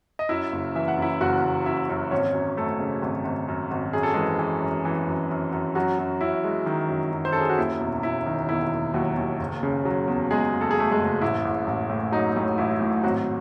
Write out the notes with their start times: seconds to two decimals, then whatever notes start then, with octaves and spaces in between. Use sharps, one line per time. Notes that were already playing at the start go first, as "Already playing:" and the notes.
0.19 D#5
0.29 F#2 E4 E5
0.52 F#1
0.76 E3 E5
0.88 F#5
0.98 F#2 E4 E5
1.21 F#1 F#4 F#5
1.43 F#1
1.66 F#2 E4 E5
1.89 F#2
2.11 G#1 C#4 C#5
2.34 F#2
2.57 F#2 A3 A4
2.80 C#3
3.02 G#1
3.25 G#1
3.48 F#2
3.71 G#1
3.93 F#2 G#4
4.03 A4
4.14 E3 G#3 G#4
4.39 E3
4.62 F#2
4.85 E3
5.08 F#2
5.30 F#2
5.52 F#2
5.75 F#2 F#3 F#4
5.99 F#2
6.21 F#2 E4
6.44 G#3
6.66 D#3
6.89 F#2
7.12 F#2
7.25 C5
7.32 F#2 A4
7.41 G#4
7.49 F#4
7.58 D#2 E4
7.80 E1
8.03 E1 E4
8.26 D#3
8.49 E1 E4
8.71 E1
8.94 D#2 F#3 F#4
9.17 D#2
9.40 F#1
9.63 C#3
9.85 F#3
10.08 E2
10.31 E2 G#3 G#4
10.53 F#1
10.61 A4
10.71 G#4
10.76 E2 A3 A4
10.91 G#3 G#4
10.99 F#1
11.22 A1 E4
11.45 A1
11.67 A1
11.89 A2
12.12 F#3 D#4
12.36 A2
12.58 A1 E4
12.81 A2
13.04 G#1 F#3 F#4